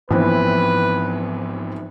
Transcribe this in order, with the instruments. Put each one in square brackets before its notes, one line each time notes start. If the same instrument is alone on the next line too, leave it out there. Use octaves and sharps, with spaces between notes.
[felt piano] A#1 E3 C4 [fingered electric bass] G#2 B3 [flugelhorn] B4